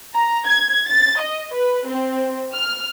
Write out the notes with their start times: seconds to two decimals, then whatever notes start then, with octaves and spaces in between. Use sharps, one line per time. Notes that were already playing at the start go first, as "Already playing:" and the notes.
0.14 A#5
0.47 G#6
0.89 A6
1.21 D#5
1.55 B4
1.88 C4
2.55 F6